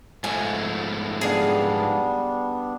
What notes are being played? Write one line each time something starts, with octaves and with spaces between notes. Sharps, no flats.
G#2 F3 A3 G#5
G3 B3 D4 G#4 F5